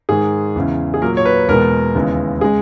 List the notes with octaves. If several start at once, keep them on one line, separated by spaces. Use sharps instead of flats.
G#2 D#3 G#3 G#4
E2 C#3 E3
G#4
A#2 F#3 A#3 A#4
C#5
B4
E2 B2 G#3 B3 A#4
D#2 C#3 E3 G#3 B3
C#3 G#3 G#4